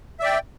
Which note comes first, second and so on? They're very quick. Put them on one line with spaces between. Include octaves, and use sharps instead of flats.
E5 D5 G5